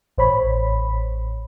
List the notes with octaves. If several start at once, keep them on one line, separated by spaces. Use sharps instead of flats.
A1 C5 C#5 B5